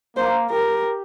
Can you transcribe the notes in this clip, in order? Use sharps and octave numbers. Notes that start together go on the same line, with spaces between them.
A#3 C5
G4 A#4